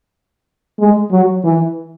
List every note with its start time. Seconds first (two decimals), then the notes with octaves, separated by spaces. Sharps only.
0.79 G#3
1.11 F#3
1.44 E3